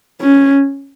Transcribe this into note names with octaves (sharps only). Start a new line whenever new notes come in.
C#4